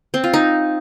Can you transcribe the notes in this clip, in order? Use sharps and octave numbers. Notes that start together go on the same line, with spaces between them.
C4
F4
D#4